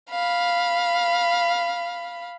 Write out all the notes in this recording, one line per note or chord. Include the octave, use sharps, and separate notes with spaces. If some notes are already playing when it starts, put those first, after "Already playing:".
F5 B5